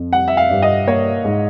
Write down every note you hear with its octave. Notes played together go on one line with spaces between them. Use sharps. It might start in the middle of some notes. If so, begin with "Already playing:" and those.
Already playing: F2
G3 F#5
E5
F5
G2
D#5
A#3 C#5
G#2